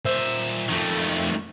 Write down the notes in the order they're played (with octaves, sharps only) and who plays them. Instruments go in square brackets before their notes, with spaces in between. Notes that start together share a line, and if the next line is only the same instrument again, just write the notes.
[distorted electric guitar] A#2 E5 [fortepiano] C5 E6
[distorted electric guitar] F2 [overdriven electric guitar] D#3 A3